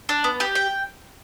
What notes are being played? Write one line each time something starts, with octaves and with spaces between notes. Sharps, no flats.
D4
B3
G4
G5